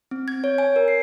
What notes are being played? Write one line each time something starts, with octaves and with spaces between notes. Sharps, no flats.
C4
G#6
C#5
G#5
A#4
C7